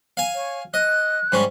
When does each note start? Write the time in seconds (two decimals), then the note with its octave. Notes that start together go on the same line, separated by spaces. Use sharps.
0.17 F5 G#5
0.34 C#5
0.74 D#5 F#6
1.32 G#2 G3 C#4